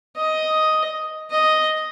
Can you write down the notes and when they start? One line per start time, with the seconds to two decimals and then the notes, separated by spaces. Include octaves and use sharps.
0.17 D#5
1.31 D#5